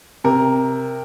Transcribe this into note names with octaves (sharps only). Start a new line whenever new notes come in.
C3 A#4